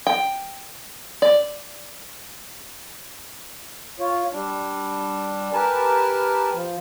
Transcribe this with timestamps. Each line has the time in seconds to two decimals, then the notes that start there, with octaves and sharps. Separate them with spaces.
0.07 G5
1.22 D5
3.99 F4 C#5
4.33 G3 D4
5.53 G4 A#4 B4 G#5 A5
6.55 F3